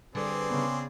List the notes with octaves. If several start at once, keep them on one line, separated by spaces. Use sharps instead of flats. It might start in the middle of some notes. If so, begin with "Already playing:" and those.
D3 G3 C4 G#4 B4 D5
C#3 B3